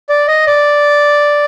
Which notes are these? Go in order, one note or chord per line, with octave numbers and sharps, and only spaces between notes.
D5
D#5
D5